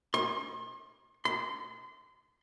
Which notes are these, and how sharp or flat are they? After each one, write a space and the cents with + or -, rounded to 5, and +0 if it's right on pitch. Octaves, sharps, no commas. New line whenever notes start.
C6 +40
C6 -30